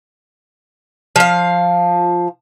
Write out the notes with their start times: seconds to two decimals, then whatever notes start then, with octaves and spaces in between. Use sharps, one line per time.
1.16 F3 F5